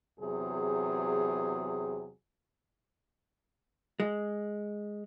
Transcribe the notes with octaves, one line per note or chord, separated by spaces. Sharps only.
E2 C3 F#3 G#4
G#3